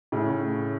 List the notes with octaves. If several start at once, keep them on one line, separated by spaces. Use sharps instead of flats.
A2 C#3